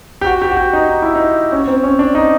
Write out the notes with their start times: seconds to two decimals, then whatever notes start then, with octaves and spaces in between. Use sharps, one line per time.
0.21 G4
0.26 F#4
0.42 G4
0.51 F#4
0.57 G4
0.73 D#4
0.89 D#4
1.02 E4
1.15 D#4
1.52 C#4
1.67 C4
1.83 C#4
1.99 D4
2.15 D#4